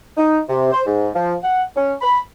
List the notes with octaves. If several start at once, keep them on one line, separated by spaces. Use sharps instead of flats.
D#4
C3
C5
G#2
F3
F#5
C#4
B5